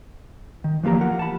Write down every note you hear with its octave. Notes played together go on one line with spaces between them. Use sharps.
D#3
E3 F3 A#3 G4 A#5
F4 A#4 F#5
A5 B5